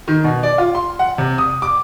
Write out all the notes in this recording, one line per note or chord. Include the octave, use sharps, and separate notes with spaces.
D#3
B2
D5
F4
C6
F#5
C3
D#6
D6